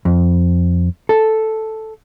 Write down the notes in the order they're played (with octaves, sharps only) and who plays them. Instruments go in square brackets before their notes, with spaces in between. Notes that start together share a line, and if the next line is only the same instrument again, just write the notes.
[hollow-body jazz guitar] F2
A4